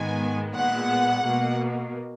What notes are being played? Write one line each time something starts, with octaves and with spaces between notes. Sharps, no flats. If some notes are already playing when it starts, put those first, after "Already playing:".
Already playing: G#2 D#3 G#3 B3 G#5
A#2 G#3 B3 F#5
B2 A#3